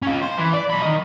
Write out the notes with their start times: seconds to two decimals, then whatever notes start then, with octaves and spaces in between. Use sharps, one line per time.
0.02 C#4 F4
0.22 C5
0.39 E3
0.54 D5
0.70 B1 B5
0.82 D#3 D#5